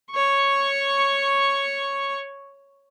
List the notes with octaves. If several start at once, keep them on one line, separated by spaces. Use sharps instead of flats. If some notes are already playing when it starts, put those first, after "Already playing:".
C#5 C#6